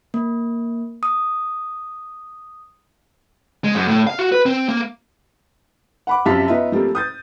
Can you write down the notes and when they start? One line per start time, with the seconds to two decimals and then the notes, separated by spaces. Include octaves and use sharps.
0.14 A#3
1.03 D#6
3.64 G#3
3.75 F#2
3.88 A2
4.07 F5
4.19 F#4
4.32 B4
4.46 C4
4.68 A#3
6.07 F#5 B5 D6
6.26 F#2 C3 F3 F5 A5 B6
6.48 B3 D#4 F4 E5
6.72 F3 G3 A3 A#3 C4
6.95 D#6 G6 A6